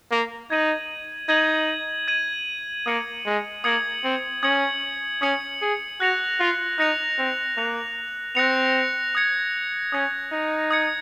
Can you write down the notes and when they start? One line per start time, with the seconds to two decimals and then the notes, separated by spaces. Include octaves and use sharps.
0.11 A#3
0.50 D#4 G#6 D#7 F#7
1.29 D#4 G#6 D#7 F#7
2.08 G#6 D#7 F#7
2.86 A#3 D#6 G#6 C#7 F#7
3.26 G#3
3.64 A#3 D#6 G#6 C#7 F#7
4.04 C4
4.43 C#4 D#6 G#6 C#7 F#7
5.22 C#4 D#6 G#6 C#7 F#7
5.61 G#4
6.00 F#4 F#6 A#6 C#7 F7
6.39 F4
6.78 D#4 F#6 A#6 C#7 F7
7.18 C4
7.57 A#3 F#6 A#6 C#7 F7
8.35 C4 F#6 A#6 C#7 F7
9.15 D#6 G#6 C#7
9.92 C#4 D#6 G#6 C#7
10.32 D#4
10.71 D#6 G#6 C#7